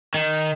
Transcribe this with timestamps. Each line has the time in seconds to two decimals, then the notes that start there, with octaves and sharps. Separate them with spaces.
0.14 D#3